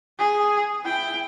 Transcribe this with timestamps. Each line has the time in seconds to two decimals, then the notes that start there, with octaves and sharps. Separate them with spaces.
0.19 G#4
0.84 E4 G5